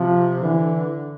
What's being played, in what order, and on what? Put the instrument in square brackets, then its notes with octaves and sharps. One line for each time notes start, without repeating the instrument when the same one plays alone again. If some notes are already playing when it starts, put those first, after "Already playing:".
Already playing: [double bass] C3 [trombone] F3
[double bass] D3 [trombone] E3